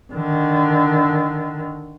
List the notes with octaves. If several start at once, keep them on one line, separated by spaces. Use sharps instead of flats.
D3 D#3